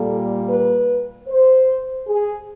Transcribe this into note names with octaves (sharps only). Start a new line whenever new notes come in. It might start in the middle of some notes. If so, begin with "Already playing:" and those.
Already playing: A#2 G3 A#3 A4
B4
C5
G#4